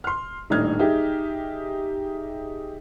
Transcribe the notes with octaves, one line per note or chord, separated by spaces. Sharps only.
C6 F6
D#1 A2 D4 D#4 F6 G#6
D#4 G4 G#4 E5